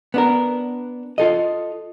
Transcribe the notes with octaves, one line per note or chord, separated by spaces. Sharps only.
B3 D4 A#4
F4 A4 D#5